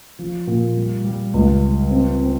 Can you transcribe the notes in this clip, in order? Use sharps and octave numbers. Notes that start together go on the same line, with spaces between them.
F3
A#2
G3
G3
C#2
G3
C4
C4